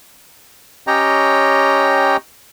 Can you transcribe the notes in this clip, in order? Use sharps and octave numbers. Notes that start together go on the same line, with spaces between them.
C#4 G4 C#5 D#5 G5 A#5